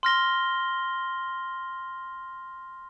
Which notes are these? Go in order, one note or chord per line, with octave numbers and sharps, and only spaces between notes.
C6 F6 A#6 G7